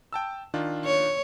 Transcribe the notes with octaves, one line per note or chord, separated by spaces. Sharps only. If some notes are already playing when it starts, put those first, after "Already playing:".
G5 A5 E6
D#3 D4 F4
C#5